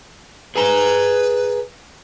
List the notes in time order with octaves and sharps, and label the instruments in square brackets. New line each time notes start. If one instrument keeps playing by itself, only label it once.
[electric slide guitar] G#4 G#5 A#5 [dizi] B4